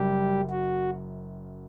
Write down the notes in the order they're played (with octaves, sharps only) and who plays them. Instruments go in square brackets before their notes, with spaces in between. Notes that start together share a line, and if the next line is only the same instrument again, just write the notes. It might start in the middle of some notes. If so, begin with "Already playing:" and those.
Already playing: [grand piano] F#1 F#2 [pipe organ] G3 G4
[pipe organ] F#4